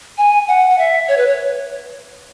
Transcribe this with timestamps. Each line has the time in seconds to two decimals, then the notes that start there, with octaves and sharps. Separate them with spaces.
0.18 G#5
0.48 F#5
0.70 F#5
0.78 E5
1.08 C#5
1.17 B4
1.27 C#5